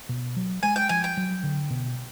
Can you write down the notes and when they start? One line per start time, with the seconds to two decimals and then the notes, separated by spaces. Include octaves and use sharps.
0.09 B2
0.37 F#3
0.63 G#3 G#5
0.76 G5
0.89 F3 G#5
1.04 G5
1.17 F#3
1.43 D3
1.70 B2